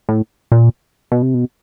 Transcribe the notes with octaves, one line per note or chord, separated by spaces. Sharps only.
A2
A#2
B2
C3
B2